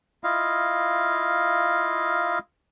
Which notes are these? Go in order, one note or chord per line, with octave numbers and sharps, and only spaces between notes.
E4 F4 D#5 F5